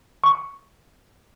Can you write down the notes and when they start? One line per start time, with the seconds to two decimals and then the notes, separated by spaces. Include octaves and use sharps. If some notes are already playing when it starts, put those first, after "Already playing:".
0.24 C#6